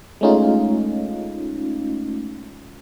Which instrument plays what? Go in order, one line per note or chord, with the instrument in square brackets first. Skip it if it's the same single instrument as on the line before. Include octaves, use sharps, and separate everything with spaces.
[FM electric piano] G#3 A3 C#4 D#4 F4